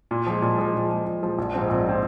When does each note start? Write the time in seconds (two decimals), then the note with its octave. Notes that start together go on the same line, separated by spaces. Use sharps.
0.11 A#2
0.27 F3 G#3
0.42 A#2
0.58 F3 G#3
0.74 A#2
0.90 F3 G#3
1.06 A#2
1.22 F3 G#3
1.38 A#1
1.54 G#2 F3 C4
1.69 A#1
1.87 F3 C4